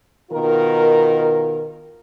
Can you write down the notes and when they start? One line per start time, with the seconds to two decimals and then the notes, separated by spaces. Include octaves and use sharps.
0.31 B2 D#3 F4 A#4